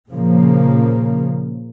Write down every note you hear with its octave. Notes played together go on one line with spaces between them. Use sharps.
A#2 C#3 F3 A#3